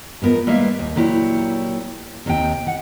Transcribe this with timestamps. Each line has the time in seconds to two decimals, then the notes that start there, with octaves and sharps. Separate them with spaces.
0.22 G#2 F3 B3 A#4
0.47 G3 G#3 A#3 B4 E5 F5
0.79 D#2
0.96 A#2 F#3 E4 G4 C#5
2.26 D#2 C3 D#4 G5
2.67 F#5